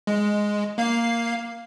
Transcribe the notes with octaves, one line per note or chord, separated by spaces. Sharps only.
G#3
A#3 F5 C7